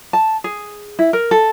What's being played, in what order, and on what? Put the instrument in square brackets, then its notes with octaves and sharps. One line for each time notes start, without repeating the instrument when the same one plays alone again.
[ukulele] A5
G#4
E4
A#4
A4